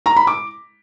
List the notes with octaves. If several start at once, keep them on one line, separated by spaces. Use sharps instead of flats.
A#5
B5
D6